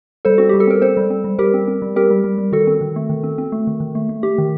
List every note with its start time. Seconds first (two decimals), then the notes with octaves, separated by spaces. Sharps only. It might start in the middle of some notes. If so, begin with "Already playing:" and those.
0.25 G3 A4 C5
0.38 C4 F#4
0.49 G3 G4
0.60 A4
0.67 C4 A#4
0.82 C4 A4 C5
0.97 G3
1.10 C4
1.24 G3
1.39 G3 G4 A#4
1.54 C4
1.68 C4
1.82 G3
1.96 C4 G4 A#4
2.10 G3
2.24 G3
2.38 G3
2.52 D#3 F#4 A4
2.67 C4
2.81 D#3
2.96 A3
3.09 D#3
3.24 C4
3.38 C4
3.52 A3
3.67 D#3
3.80 D#3
3.95 A3
4.09 A3
4.23 A3 G4
4.38 D#3